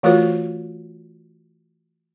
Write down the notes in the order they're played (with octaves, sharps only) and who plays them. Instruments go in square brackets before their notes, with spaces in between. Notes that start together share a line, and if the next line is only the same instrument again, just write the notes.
[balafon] E3 A3 F4 F#4 A#4 C5